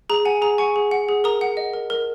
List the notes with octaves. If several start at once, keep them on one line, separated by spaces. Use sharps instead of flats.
G#4 A#5
F#5 G#5
G#4 A#5
F#5 G#5 C#6
G#4
F#5
G#4
A#4 A#5 D#6
F#5
D#5
A#4
A#4